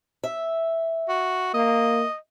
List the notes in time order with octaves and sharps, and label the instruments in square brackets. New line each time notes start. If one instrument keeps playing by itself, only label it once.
[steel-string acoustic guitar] E5
[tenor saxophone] F#4
[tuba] A#3 [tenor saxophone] D#5